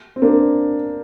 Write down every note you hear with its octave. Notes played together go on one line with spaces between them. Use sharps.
C4
A#3 D4